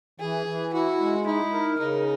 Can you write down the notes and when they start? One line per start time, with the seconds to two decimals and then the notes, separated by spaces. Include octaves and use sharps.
0.20 E3 G#4
0.46 E3
0.73 E4 F#4
0.99 G#3
1.26 D#4 E4
1.53 A#4
1.79 C#3 D#4